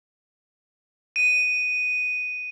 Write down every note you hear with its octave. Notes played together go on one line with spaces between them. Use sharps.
D#7